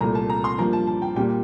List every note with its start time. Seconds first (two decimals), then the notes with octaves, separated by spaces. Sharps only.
0.01 C2 A#2 A3 A#5
0.15 A5
0.30 A#5
0.44 C6
0.58 G2 F3 A#3 A#5
0.73 A5
0.87 A5
1.02 G5
1.16 A#2 G3 A#3 G5